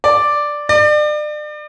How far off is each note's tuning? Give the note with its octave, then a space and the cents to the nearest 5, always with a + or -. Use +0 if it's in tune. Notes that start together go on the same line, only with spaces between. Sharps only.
D5 +0
D5 +35